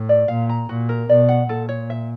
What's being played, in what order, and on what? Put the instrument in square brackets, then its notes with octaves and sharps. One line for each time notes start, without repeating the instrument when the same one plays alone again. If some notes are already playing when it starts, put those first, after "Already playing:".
Already playing: [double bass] A2
[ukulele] D5
[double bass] A#2 [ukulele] F5
[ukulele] A#5
[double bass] A#2 [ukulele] F#4
[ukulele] A#4
[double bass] B2 [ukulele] D5
[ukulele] F#5
[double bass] A#2 [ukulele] A4
[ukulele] C#5
E5